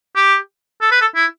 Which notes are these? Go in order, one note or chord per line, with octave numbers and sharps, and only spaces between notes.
G4
A4
B4
A4
E4